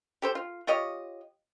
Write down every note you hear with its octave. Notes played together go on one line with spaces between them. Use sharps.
G4 A4 C5
F4
F4 G4 C#5 D#5